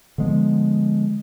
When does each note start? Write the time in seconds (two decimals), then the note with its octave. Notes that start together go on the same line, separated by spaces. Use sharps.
0.18 D3 F3 G#3 B3